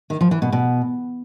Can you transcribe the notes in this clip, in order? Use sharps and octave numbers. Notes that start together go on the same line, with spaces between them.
D#3
F3
E3
B2
B2